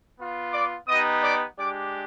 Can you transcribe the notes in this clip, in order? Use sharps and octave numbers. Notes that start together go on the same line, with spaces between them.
B3 F4
D5 D6
B3 D#4 G4 D#5 D#6
D5 D6
G#3 D4 G4 D5 D6